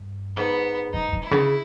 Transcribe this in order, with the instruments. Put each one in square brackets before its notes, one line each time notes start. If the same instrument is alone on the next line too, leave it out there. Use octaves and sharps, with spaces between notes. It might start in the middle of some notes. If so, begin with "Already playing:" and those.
Already playing: [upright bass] G2
[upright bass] G#2 [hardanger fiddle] B3
[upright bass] G#2 [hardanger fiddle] D#4
[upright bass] G#2
[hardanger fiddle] E4
[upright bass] C#3